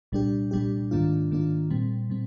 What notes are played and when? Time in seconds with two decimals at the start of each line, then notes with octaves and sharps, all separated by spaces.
0.12 C2 A#2 G3 D4 G4
0.51 C2 A#2 G3 D4 G4
0.91 G#2 D#3 A#3 D4 F4
1.31 G#2 D#3 A#3 D4 F4
1.70 A#2 G3 C4
2.10 A#2 G3 C4